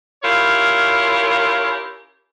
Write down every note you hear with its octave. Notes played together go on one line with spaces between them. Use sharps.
C#4 E4 F4 G4 A#4 C#5